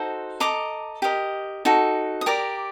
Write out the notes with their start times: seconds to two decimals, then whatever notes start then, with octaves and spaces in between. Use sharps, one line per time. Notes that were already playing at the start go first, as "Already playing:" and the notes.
Already playing: D#4 F#4 A4 C5
0.40 A4 C5 D#5 A#5 D6
1.02 G4 A#4 D#5
1.65 D#4 F#4 A4
2.21 D#6
2.26 G4 A#4 D5 A#5 D6